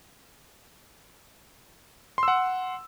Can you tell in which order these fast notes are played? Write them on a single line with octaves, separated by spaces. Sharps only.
C6 E6 F#5